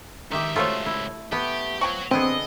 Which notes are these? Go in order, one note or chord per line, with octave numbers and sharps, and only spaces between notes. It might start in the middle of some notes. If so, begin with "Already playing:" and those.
C#2 D#3 G4 E5
F#3 A3 F4 A4 C5 C#5
E4
A3 B3 G4
F3 F#4 C#5 G5 C#6
D3 B3 C4 G#4 D#5 G5